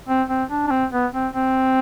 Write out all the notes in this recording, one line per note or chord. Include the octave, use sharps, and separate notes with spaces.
C4
C4
D4
D4
C4
B3
C4
C4